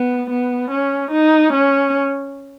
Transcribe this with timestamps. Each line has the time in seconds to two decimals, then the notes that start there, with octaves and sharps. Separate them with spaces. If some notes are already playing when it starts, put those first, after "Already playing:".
Already playing: B3
0.30 B3
0.70 C#4
1.11 D#4
1.53 C#4